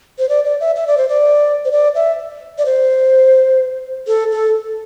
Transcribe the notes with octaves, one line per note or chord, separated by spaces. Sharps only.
C5
D5
D5
E5
E5
D5
C5
D5
C5
D5
E5
D5
C5
A4
A4